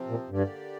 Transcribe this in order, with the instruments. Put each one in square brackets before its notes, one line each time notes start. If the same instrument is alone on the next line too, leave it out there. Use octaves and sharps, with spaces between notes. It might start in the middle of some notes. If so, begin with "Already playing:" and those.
Already playing: [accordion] C3 F3 C4
[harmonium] A#2
[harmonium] G2 [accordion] D3 A#3 G4 D5